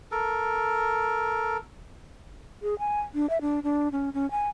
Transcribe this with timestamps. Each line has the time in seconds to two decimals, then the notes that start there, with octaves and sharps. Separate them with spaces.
0.11 A4 A#4
2.62 G#4
2.79 G#5
3.14 D4
3.30 E5
3.41 D4
3.64 D4
3.92 C#4
4.14 C#4
4.31 G#5